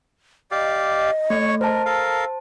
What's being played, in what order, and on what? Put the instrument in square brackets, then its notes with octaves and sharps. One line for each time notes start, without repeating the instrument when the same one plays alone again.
[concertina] G4 D5 F5 [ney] D#5
[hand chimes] A3 [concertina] C#5 C#6
[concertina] A#4 [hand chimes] C5 A5
[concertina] A4 A#4 F5